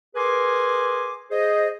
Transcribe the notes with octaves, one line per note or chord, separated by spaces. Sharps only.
G#4 A#4 B4 G#5 C6 D6
G#4 C5 D#5